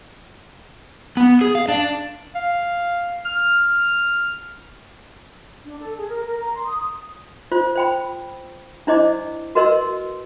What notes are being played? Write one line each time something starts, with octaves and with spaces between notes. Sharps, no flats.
B3
G#4
F5
D4
F5
F6
D4
A4
G#4
A#4
A#4
A#5
C6
D#6
F4 C5
C5 G5 B5
D4 E4 C5 D5 D#5 D6
F#4 A#4 B4 D#5 C6 E6